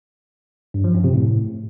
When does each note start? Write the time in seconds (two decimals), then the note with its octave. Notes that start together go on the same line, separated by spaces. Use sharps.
0.74 G2
0.84 F3
0.94 F#2
1.04 C3
1.14 A2